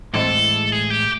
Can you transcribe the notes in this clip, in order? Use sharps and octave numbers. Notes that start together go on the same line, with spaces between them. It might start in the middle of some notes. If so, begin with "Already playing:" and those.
A2 E3 G#3 C4 E4 A4
G#4
G4